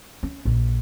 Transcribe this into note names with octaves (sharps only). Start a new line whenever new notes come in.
C#4
A#1